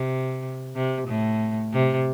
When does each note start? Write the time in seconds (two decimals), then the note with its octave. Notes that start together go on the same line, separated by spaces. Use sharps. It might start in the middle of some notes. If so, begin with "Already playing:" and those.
Already playing: C3
0.75 C3
1.08 A2
1.73 C3